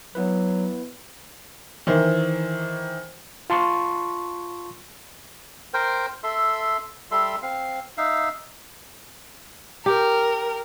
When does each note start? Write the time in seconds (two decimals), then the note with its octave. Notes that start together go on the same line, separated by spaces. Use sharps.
0.15 F#3 B3 E4 B4
1.87 D#3 E3 C5
3.50 F4 A5 C6 C#6
5.74 A#4 C5 G5
6.23 A4 E5 C6
7.11 G3 A4 E5 C6
7.42 C4 F5
7.97 D#4 E5 F5
9.86 G4 A#4